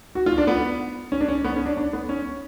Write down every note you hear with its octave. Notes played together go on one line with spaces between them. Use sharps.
F#4
F4
D4
B3
C#4
D4
C#4
B3
C#4
D4
D4
B3
C#4